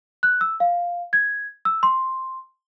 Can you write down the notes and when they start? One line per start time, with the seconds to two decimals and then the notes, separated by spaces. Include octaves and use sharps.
0.23 F#6
0.41 E6
0.60 F5
1.13 G#6
1.65 E6
1.83 C6